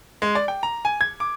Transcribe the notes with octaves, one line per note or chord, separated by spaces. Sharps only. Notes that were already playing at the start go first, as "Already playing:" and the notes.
G#3
D5
G5
A#5
G#5
G#6
D6